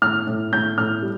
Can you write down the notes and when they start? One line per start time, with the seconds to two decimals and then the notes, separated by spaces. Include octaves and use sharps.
0.02 A2 F6
0.27 A2
0.53 A2 G6
0.78 A2 F6
1.02 G3